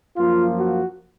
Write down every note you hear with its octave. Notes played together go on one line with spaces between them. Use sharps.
F#2 F3 A#3 F4
F#4